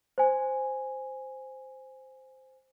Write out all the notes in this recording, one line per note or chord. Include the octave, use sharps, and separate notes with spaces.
C5 G#5